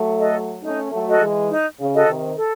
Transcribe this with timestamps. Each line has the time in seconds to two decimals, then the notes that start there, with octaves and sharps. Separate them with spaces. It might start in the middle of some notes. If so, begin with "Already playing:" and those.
Already playing: F#3 A3
0.19 F#4 A4 D#5
0.62 A3 C#4 D#4
0.91 F#3 A3
1.06 F#4 A4 D#5
1.20 E3 G#3
1.50 D#4
1.79 C#3
1.93 F#4 A4 D#5
2.07 C3 D#3
2.36 A4